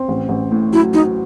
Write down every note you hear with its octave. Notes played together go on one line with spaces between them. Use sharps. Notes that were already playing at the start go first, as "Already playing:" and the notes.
Already playing: C4
A1
A1
A2
F#3 E4
F#3 D#4